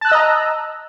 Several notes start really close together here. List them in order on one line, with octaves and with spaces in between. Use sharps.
A5 F#6 E6 D#5 A#5